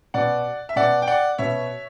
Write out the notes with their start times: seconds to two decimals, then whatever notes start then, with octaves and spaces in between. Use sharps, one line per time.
0.14 B2 D5 F#5
0.69 E5
0.76 B2 D5 F#5
1.02 G5
1.07 D5 F#5
1.38 B2 C#5 E5